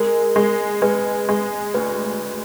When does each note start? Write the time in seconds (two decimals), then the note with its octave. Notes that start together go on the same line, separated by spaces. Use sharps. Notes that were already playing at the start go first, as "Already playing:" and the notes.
Already playing: G#3 A#4
0.36 G#3
0.82 G#3 B4
1.29 G#3
1.74 D2 B4